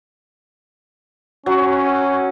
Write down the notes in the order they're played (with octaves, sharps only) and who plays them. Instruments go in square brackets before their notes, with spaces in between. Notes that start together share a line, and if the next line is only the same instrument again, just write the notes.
[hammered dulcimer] F#3 [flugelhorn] C#4